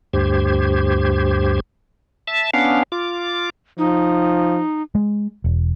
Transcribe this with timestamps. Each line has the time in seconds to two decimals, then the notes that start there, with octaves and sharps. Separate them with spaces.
0.13 D2 G2 G4 C5 G#6
2.27 E5 A5
2.54 B3 C#4 D4 F5
2.92 F4 D6
3.78 F3 D#4
4.95 G#3
5.44 E1